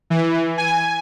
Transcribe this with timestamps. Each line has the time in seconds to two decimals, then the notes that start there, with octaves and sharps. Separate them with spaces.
0.10 E3
0.58 G#5